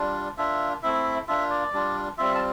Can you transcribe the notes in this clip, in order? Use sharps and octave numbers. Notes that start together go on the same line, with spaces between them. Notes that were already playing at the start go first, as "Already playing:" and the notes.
Already playing: G3 D4 F4
A#3 D4 F4 E5
A3 C4 E4 E5
A#3 D4 F4 E5
D5
G3 D4 F4
G3 C4 F4 E5
A5